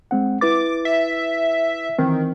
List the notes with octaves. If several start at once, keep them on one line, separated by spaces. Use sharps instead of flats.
G#3 C4 F#5
E4 B4 D6 A6
E5
D#3 E3 C4